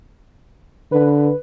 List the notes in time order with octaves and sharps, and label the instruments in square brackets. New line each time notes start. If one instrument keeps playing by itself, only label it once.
[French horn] D3 [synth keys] B4